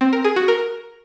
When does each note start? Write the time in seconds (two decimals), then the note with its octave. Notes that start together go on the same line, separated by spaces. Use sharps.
0.01 C4
0.13 A#4
0.24 G#4
0.36 F#4
0.48 A#4